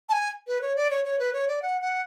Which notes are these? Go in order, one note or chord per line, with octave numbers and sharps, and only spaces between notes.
A5
G#5
B4
C#5
D5
C#5
C#5
B4
C#5
D5
F#5
F#5